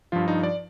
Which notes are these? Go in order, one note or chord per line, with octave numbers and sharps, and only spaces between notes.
G2 F3 F4
D#4
D5